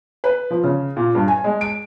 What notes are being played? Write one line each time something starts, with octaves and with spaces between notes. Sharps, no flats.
B4
F3
C#3
A#2
G2
G#5
G#3
D7